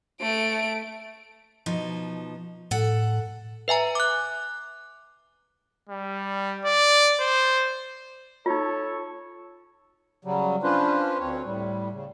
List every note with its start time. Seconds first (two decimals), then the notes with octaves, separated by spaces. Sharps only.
0.21 A3 D7
1.66 B2 F3 D#4
2.71 A2 A4 F#5
3.68 B4 E5 G#5 A#5
3.95 D6 F#6
5.89 G3
6.65 D5
7.20 C5
8.46 D#4 F4 A4 C#5
10.25 C#3 F#3 G3
10.63 C#4 D4 F4 B4 C5
11.19 D2 C4 C#5
11.45 A2 G3
11.92 C#3